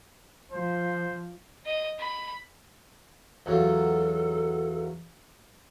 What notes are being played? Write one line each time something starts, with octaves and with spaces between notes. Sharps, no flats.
F3 C5
D#5
B5
E2 F#3 F4 A4